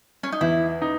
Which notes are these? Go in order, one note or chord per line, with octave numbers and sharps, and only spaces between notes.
C#4
D#4
E2 E4
D#4